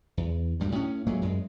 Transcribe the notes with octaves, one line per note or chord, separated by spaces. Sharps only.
E2
D2 G2 G3
A2 C#4
A#2 F#3 G#3 A3
F#2 G#3